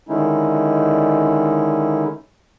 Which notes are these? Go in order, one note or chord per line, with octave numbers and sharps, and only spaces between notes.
D3 D#3 G#3 C#4 D#4 E4